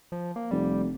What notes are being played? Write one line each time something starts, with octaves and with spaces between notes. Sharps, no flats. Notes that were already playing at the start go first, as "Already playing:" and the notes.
F3
A#3
F1 G3